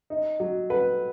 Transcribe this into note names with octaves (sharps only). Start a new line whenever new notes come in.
D#4
F#3
B4